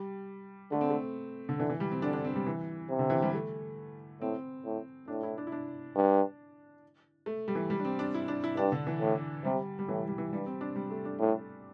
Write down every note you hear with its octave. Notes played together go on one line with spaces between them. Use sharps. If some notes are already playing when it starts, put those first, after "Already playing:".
Already playing: G3
D3 A3
C4
A3
D3
D3 E3
E3
G3
C4
D3 D4
D4
C4
G3
E3
C3
D3
E3
G3
A3
A2 C4
A2
A2 D4
E4
D4
E4
D4
G2
A3
G3
E3
G3
D4
C4
D4
E4
D4
E4
G2 D4
D3
E3
A2
C3 G3
G3
A2 E3
G3
E3
G2 G3
C4
D4
G3
A3
D4
A2